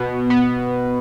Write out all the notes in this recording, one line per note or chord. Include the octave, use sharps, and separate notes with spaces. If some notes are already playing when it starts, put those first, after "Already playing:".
Already playing: B2 B3
B3